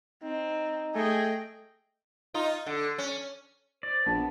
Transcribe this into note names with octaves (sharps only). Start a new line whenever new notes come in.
C4 D#4
A3 G#4 D#5 G5
D#4 F4
D3
C#4
C5 D5
A#1 B3 A5